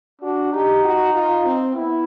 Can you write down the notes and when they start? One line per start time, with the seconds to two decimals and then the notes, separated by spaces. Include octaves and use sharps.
0.22 D4 F#4
0.52 D#4 G4
0.84 F#4
1.14 F4
1.45 C4
1.75 B3 E4